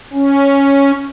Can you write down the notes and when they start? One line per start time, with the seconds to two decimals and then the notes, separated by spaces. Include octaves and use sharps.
0.13 C#4